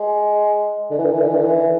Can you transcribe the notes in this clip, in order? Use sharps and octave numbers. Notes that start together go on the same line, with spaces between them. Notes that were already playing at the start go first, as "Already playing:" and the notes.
Already playing: G#3
D3
E3
D3
E3
D3
E3
D3
E3